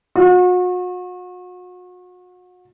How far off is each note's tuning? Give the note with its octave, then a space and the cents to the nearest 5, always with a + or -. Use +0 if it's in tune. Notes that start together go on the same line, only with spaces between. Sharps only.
F#4 -40